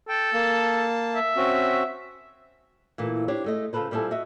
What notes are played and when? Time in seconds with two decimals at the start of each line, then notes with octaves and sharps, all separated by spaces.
0.09 A4 G5
0.33 A#3 A5
1.15 E5
1.37 C4 C#4 F#4
2.98 A#2 E3 A3 A#3
3.28 D4 G4 C5 C#5
3.44 G#3 A3 D#5
3.73 C#3 F4 G#4 A4 B4 C5
3.91 A#2 G3 C4 E4 A4 G#5
4.11 F#4 D#5 E5